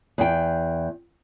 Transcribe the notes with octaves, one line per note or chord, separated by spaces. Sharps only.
E2 G5